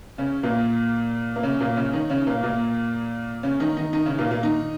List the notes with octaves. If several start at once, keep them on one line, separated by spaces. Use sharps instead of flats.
C#3 C#4
A#2 A#3
A#3
C#3 C#4
A#2 A#3
C#3 C#4
D#3 D#4
C#3 C#4
A#2 A#3
A#2 A#3
C#3 C#4
D#3 D#4
D#3 D#4
D#3 D#4
C#3 C#4
A#2 A#3
A#2 A#3
D#3 D#4